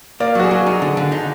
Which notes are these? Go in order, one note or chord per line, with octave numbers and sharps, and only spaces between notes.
A#3 D5
F#3 F#4
G#4
F#3
D#4
D3
D3
D#4